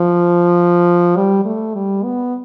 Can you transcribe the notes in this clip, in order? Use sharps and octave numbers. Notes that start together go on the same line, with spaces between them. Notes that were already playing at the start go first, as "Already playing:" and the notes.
Already playing: F3
G3
A3
G3
B3